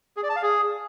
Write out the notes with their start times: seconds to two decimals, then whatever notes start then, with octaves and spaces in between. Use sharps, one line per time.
0.17 G#4
0.23 D5
0.30 A5
0.36 F5
0.42 G#4